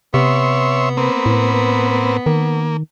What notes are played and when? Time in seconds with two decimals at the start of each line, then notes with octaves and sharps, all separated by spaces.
0.14 C3 B3 C#5 E5 C6
0.97 A#3 C4 B4
1.26 A2
2.26 D#3 A#3